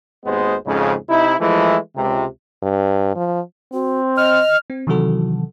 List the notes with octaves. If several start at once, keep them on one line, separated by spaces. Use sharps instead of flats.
G#1 D#2 G#3 B3 C5
F2 G#2 C#3
C3 D#4 E4
E3 F3 G#3 A3 E4
C#2 C3
G2
F3
C4 F#4
D#5 F6
C4
C3 D#3 E3 F#3 F#4 A4